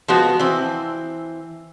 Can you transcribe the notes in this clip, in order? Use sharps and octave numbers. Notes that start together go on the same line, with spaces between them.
F3 G#3 B3 F#4
E3 C4